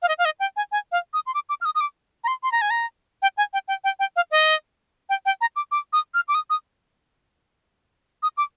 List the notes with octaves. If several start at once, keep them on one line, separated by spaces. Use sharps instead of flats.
F5
D#5
F5
D#5
G5
G#5
G#5
F5
D#6
C6
D6
D6
F6
D#6
D#6
D6
A#5
C6
C6
A#5
G#5
A#5
G5
G#5
G5
G5
G5
G5
F5
D#5
G5
G5
A#5
D6
D6
D#6
F6
D6
D#6
D#6
D#6
D6